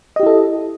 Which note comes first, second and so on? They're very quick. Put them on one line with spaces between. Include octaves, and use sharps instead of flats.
D#5 G4 E4 A4